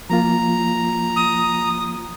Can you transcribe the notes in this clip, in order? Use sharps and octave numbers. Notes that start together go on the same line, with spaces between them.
F3 A#3 F4 A#5
D#6